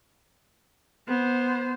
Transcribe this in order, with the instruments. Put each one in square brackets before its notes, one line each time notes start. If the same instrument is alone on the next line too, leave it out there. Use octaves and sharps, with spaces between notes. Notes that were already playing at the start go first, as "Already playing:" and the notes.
[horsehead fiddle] B3 C5